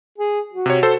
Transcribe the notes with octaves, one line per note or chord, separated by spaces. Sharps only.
G#4
F#4
C3 C#5
A4 C5